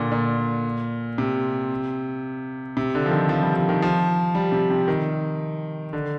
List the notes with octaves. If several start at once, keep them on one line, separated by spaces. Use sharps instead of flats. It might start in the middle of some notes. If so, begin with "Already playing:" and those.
Already playing: A#2 D3
A#2
C3
C3
D3
F3
D#3
F3
G3
F3
D#3
F3
G3
C3
C3
D#3
D3